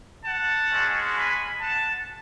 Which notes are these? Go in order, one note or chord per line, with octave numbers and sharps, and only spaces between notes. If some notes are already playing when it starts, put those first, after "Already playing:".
F#5 A5
G#3 C#4 F#4
G#5 B5
F#5 A5